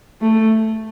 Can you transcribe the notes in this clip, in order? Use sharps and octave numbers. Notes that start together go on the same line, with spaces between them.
A3